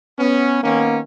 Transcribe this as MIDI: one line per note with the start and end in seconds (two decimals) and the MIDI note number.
0.19 0.60 59
0.19 0.60 61
0.64 1.00 51
0.64 1.00 58
0.64 1.00 59
0.64 1.00 61